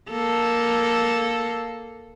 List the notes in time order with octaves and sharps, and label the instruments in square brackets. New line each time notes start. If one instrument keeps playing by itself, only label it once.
[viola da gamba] A#3 A4